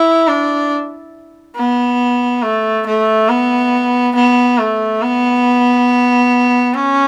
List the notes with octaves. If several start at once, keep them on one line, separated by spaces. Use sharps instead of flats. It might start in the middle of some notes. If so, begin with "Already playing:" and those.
Already playing: E4
D4
B3
A3
A3
B3
B3
A3
B3
C#4